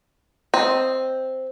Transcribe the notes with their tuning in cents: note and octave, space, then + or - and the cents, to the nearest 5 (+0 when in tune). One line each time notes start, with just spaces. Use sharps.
C4 +0 D#5 +0